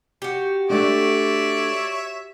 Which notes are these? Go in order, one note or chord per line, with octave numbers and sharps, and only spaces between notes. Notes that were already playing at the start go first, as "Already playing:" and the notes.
F#4 G4
A3 D4 C#5 D5 E5